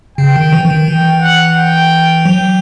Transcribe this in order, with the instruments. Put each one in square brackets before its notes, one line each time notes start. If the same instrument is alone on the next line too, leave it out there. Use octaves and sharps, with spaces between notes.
[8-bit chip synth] C#3 [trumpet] G5
[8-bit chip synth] D#3
E3
E3
D#3
[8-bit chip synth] E3 [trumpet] G5
[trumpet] F#5
G5
[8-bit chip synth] F#3